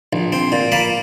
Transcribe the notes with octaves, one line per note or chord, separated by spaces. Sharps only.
A#1
C4
A#2
A#3 A5 B5